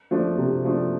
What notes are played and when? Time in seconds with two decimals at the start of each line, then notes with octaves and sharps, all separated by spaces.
0.11 F3 A3 D4
0.38 C3
0.64 F3 A3 D4